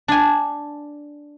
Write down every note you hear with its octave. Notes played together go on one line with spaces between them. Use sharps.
D4 G#5